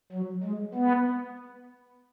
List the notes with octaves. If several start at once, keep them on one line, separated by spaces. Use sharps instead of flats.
F#3
G#3
B3